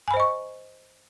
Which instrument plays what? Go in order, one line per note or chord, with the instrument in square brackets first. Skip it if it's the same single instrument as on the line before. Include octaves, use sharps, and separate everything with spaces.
[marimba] G#5
B5
C5
D#5
C#6